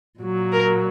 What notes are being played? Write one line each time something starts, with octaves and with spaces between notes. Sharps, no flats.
A#2 F#3
A#4